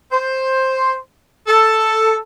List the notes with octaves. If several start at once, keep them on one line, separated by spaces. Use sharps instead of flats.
C5
A4